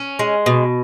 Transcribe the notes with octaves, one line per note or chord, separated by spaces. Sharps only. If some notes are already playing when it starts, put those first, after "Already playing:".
Already playing: C#4
G#3
B2